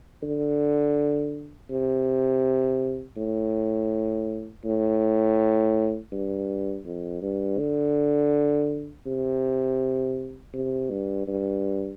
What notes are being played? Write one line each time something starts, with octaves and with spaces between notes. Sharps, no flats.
D3
C3
A2
A2
G2
F2
G2
D3
C3
C3
G2
G2